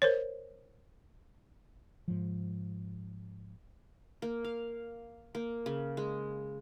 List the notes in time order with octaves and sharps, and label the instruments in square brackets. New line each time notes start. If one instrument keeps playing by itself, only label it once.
[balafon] A#4 C5 C#5
[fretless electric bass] G#2 F3
[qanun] A#3
F5
A#3
C#3
G#3